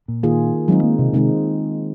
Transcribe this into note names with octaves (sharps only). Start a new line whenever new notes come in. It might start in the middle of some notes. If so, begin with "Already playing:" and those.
A#2
D#3 A#3 F4 G#4
D#3 F#3 G#3 C4 D#4
A#3
C3
C3 D#3 G#3 C4 D#4